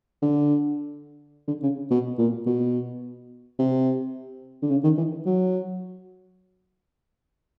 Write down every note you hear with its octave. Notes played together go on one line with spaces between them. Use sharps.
D3
D3
C#3
B2
A#2
B2
C3
D3
C#3
D#3
E3
F#3